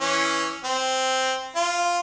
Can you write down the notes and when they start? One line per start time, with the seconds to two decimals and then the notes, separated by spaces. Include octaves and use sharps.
0.01 E3 C#4
0.64 C4
1.56 F4